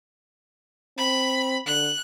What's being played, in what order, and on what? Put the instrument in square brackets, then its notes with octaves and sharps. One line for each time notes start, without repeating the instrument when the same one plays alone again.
[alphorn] C4 [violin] B5
[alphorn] D3 [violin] F#6